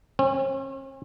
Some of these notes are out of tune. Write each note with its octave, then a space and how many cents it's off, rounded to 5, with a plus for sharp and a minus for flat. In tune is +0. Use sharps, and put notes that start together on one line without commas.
C#4 -45